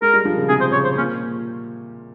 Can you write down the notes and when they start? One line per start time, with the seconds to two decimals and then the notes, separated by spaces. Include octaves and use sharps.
0.02 G#3 A#4
0.14 G3
0.25 F3
0.37 C#3
0.49 C3 G#4
0.60 C5
0.72 C#3 C#5
0.84 C5
0.97 A#2 C#4